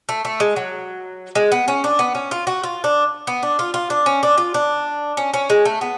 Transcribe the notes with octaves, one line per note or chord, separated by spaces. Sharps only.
A3
A3
G#3
F#3
G#3
B3
C#4
D4
B3
C#4
F4
F#4
F4
D4
B3
D4
F4
F4
D4
C#4
D4
F4
D4
C#4
C#4
G#3
A3
B3